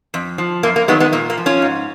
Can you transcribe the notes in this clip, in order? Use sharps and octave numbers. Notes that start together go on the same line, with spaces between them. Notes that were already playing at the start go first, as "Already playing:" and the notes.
F2
F3
F#2 A#3
A#3
D#3 F#3 G#3 B3
G#3 B3
A#2 A#3
A#3
F3
C#4 F4
G#2